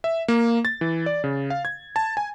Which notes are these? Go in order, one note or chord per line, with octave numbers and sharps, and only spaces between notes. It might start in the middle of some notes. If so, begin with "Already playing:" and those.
E5
A#3
A6
E3
D5
C#3
F5
G#6
A5
G#5